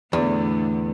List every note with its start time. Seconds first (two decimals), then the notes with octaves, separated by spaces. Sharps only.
0.13 E2 A2 D3 B3